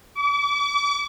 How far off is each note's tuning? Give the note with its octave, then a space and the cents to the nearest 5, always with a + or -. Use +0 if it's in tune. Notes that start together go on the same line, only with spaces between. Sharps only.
D6 -40